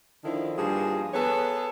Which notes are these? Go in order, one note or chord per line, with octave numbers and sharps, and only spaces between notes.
D3 D#3 F3 E4
G2 F3 A#3 G#4
B3 G#4 A4 B4 C#5